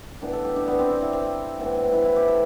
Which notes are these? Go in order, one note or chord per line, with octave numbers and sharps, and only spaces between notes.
A2 E3 B3 D4
A4
G4
D4
B3
C4
D4
E4
C4
A2 E3 B3
E4
E4
G4
A4